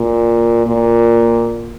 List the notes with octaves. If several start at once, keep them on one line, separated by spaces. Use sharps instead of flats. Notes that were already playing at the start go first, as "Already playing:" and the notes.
Already playing: A#2
A#2